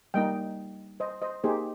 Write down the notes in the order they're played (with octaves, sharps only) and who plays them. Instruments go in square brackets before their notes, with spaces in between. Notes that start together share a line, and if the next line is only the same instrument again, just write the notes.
[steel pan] G3 A#3 D#4 D#5 G5
C5 D#5
C5 D#5
A#3 D#4 G4 G#4 C5